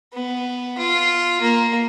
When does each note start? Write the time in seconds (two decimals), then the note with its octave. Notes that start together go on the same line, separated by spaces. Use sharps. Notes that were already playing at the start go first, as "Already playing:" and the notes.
0.14 B3
0.78 F4
1.41 A#3